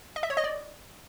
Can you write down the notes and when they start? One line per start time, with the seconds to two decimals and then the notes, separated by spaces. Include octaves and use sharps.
0.16 D#5
0.23 E5
0.30 C#5
0.37 D#5
0.44 D5